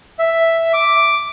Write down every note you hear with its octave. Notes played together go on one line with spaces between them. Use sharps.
E5
D6